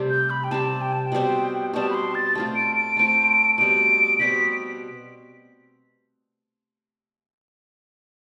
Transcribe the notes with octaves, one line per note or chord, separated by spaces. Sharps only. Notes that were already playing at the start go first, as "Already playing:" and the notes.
Already playing: C3 G3 A3 C4 G4
G6
B5
G5
C3 G3 C4 G4 A5
G5
A5
G5
B2 G3 C4
B2 G3 C4 A5
B5
C6
A6
A3 C4 F4
D7
D7
A3 C4 F4
B2 G3 C4 D7
B2 G3 C4 B6